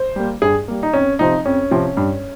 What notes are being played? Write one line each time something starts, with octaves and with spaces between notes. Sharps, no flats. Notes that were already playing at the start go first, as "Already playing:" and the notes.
Already playing: C5
G3 A#3
G2 G#4
G3 A#3
D#4
F2 C#4
C3 F3 C4 D#4
F2 C#4
C3 F3 C4
G2